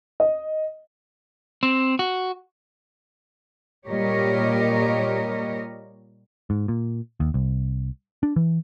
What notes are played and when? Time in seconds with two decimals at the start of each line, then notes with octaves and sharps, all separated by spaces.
0.20 D#5
1.63 C4
1.99 F#4
3.87 A#2 G3 G4 A#4 C#5 D#5
6.50 G#2
6.68 A#2
7.20 D#2
7.34 C2
8.23 D4
8.36 E3